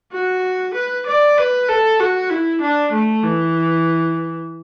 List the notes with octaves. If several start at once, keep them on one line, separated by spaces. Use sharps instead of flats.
F#4
B4
D5
B4
A4
F#4
E4
D4
A3
E3